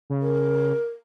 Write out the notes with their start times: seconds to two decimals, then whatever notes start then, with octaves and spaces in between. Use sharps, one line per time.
0.10 C#3
0.22 A#4